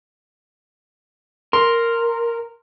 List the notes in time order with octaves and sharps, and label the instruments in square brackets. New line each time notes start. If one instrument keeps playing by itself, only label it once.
[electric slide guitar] A#4 [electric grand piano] C6